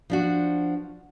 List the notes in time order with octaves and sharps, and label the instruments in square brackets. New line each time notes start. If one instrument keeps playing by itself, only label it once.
[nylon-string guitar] F3 D4 F#4